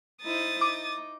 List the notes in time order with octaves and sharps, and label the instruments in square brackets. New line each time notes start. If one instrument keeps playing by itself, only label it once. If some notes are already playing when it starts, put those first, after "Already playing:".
[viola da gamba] D#4 E4 C5 [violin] D#6 A6
[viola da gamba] D#4 [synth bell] D6